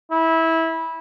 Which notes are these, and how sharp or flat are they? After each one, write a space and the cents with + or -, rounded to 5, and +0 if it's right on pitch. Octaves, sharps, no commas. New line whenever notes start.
E4 -20